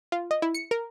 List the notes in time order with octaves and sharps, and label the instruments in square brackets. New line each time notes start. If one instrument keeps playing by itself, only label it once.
[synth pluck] F4
D#5
E4
C#7
A#4